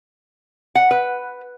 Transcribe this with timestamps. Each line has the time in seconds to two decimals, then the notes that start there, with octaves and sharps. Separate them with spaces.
0.75 F#5
0.91 B4